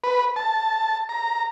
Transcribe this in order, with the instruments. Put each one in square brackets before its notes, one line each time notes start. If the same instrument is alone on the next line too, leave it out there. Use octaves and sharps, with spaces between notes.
[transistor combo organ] B4
A5
A#5